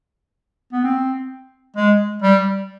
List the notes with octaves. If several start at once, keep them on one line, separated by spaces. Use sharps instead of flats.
B3
C4
G#3
G3